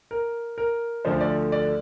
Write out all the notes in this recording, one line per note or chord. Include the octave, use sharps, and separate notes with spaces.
A#4
A#4
D2 D3 F3 A3 C5
D5
D5